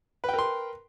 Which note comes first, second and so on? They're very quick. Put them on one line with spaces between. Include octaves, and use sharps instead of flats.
B4 G5 A#4 C6